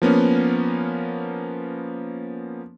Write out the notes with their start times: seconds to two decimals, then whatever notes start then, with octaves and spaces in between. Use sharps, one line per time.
0.02 F3 A#3 B3 C#4